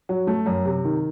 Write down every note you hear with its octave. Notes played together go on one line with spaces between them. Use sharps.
F#3
A3
F#2
C3
D#3